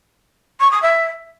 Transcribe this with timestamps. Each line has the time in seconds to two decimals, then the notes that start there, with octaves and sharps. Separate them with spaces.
0.60 C#6
0.71 D#6
0.82 E5